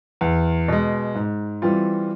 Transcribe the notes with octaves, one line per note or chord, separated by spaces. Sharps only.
E2
B2 G#3
G#2
E3 G3 C4 F4